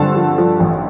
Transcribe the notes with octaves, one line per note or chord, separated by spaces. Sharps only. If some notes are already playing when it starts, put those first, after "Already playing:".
Already playing: G2 D3 F3 A4 C5 A5 C6
F3
F3
A1